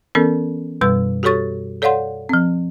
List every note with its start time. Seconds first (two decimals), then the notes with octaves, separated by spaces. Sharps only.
0.15 E3 B3 C#4 A4 A#4
0.81 F#2 B2 G3 B4 E6
1.23 F#4 G4 A4 C#5 C#6 A6
1.82 A4 C#5 D5 F5 F#5 C6
2.29 F3 C4